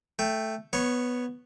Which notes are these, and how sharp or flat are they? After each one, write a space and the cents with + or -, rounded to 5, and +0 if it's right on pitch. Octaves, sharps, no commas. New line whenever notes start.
A3 +0 G5 +0
B3 +0 C#5 +0 C#6 -25